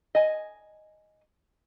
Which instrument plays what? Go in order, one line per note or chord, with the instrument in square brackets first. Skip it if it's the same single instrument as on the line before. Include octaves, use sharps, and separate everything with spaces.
[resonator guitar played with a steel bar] D#5 G#5